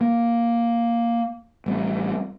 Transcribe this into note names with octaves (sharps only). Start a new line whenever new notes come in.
A#3
A1 G3 C4